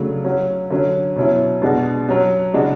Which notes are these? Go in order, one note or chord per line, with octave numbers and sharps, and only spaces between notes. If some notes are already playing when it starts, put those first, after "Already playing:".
Already playing: C#3 F#3 A3 D4
F#3 C#4 F#4
D3 F#3 C#4
B2 F#3 C#4 E4
B2 G#3 D4 F#4
F#3 C#4 F#4
C#3 G#3 D4 F#4